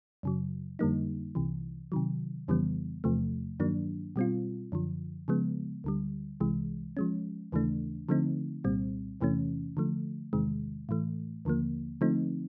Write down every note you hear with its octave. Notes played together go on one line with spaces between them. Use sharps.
F#2 C#3 F#3
F2 D3 G3 A#3 D#4
C2 C3 E3
C3 D#3 F#3
F2 C#3 E3 G3 B3
E2 C3 F3 A3
G2 D#3 F#3 A#3 D4
B2 G3 C4 F4
F#2 D3 F3
C#3 F3 G#3 B3
D2 D3 G3
C2 C3 E3 G#3
F3 G#3 C#4
D#2 C#3 E3 A3 D4
D3 F3 A3 C4 D#4
C2 A#2 G3 C4
E2 C3 E3 A3 C#4
D3 F3 A3
E2 C3 D#3 G#3
A2 E3 A3
D#2 D3 F3 A#3
D3 F3 A3 C4 D#4